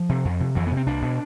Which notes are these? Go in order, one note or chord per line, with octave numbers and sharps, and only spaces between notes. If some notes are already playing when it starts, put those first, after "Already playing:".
Already playing: F3
C3
F2
C3
F2 E3
C3 B3
C4
C2 D4
B2